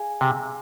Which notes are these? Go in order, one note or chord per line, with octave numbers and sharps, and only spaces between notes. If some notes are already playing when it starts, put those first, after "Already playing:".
Already playing: G#4 F5 G#5
C3